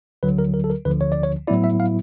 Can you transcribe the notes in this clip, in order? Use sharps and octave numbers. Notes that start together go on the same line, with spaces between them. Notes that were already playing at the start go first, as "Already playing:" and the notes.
D2 D3 F#3 B4
A#4
A#4
A4
A#4
D2 D3 F3 B4
C#5
D5
C#5
A2 F#3 B3 E4 D5
E5
F5